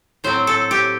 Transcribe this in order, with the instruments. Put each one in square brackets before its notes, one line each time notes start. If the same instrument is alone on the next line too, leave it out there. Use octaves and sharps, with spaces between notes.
[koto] A2 F#3 C4 C5
A4
G4